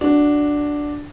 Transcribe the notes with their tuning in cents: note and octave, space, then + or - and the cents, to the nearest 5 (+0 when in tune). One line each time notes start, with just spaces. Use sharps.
D4 +0 F#4 +0